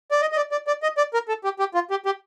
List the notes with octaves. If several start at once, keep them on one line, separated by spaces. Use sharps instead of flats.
D5
D#5
D#5
D5
D5
D5
D#5
D5
A#4
A4
G4
G4
F4
G4
G4